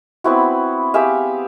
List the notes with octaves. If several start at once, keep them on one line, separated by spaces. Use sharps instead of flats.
B3 C4 E4 F#4
G4 G#4 E5 F5